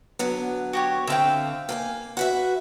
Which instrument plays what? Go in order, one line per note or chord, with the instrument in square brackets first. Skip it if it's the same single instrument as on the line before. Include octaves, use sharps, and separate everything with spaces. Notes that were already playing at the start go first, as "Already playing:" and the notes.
[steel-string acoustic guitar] D3 F#3 B3
[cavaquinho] F#4 G4 C#5
[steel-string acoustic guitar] D3 C4 [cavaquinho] E5 F5 G5
[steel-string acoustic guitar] A#3 A#4 G#5
F#4 B4 E5